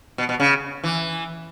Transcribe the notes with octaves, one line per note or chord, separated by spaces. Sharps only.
B2
B2
C#3
E3